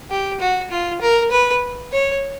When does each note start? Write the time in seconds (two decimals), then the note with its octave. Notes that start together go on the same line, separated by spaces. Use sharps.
0.11 G4
0.40 F#4
0.71 F4
1.01 A#4
1.31 B4
1.92 C#5